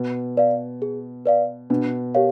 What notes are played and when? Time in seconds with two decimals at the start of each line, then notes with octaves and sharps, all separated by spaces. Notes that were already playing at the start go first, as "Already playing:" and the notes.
Already playing: B2
0.37 B4 D5 F5
0.82 G#4
1.26 B4 D5 F5
1.70 B2 D4
2.15 G4 A#4 C#5 F5